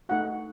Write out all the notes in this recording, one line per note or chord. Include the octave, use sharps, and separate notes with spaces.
A3 D#4 F#4 F#5